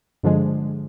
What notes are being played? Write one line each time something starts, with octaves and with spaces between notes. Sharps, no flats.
G2 D3 F3 G#3